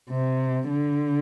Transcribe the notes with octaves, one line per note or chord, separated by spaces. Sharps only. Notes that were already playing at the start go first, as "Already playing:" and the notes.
C3
D3